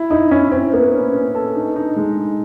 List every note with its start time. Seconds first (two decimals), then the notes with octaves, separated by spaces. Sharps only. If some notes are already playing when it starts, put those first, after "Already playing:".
Already playing: E4
0.10 D#4 E4
0.31 C#4 E4
0.51 C4 E4
0.73 A#3 B3
0.94 C#4
1.14 C#4
1.35 A4
1.55 D#4
1.76 D#4
1.96 G#3
2.17 D#4